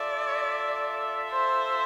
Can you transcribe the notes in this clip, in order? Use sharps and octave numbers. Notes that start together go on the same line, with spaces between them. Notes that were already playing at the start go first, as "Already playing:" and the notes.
Already playing: F4 A4 D5 E5
C5